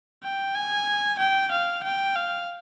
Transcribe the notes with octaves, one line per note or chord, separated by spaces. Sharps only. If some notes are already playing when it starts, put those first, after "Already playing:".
G5
G#5
G5
F5
G5
F5